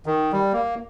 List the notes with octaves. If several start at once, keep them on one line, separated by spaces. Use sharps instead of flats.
D#3
G3
A#3